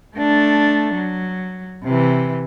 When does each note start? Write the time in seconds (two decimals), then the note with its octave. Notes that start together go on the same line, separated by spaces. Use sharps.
0.17 A3 D4
0.94 F#3
1.84 C3 E3